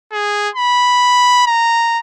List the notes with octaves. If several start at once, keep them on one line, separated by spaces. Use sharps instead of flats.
G#4
B5
A#5